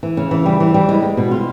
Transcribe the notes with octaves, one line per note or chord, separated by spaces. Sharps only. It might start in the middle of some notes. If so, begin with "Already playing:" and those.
E3
C#3
E3
G3
E3
G3
G#3
G#3
B2
F4